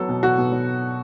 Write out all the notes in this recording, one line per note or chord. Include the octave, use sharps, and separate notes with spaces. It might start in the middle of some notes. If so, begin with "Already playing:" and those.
Already playing: F#3 B3 A4
B2
B2 F#4
B2
F#3